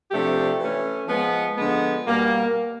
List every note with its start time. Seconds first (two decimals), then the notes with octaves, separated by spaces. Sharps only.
0.11 C3 F3 A3 D4 G4
0.59 E3 A3 C#4
1.07 F3 G#3 B3
1.56 D3 F3 G#3 B3
2.05 B2 G3 A#3